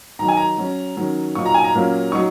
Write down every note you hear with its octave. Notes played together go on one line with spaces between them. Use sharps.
D#3 F#3 D#4 A#5
G#5
A#5
F#3 C#4
D#3 F#3 C#4
A#2 F#3 D#4 C#6
A#5
G#5
A#5
A#2 F#3 A#3 C#4
F#3 D#4 C#6